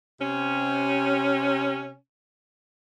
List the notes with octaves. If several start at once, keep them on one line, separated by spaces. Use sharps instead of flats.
C3 C#4